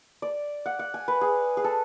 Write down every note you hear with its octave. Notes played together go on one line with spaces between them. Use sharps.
D5
F#5
F#5
G#5
B4
G#4
G#4
A4